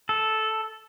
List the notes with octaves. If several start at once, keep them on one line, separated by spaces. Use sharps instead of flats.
A4